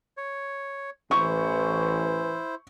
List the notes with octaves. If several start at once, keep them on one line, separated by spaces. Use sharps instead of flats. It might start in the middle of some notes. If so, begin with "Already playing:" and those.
C#5
A1 E3 E4 C5 C#6